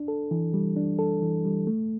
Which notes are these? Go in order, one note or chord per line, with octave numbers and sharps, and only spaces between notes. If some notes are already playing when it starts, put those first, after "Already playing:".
Already playing: D4
A4
E3
G3
D4
A4
E3
G3
A3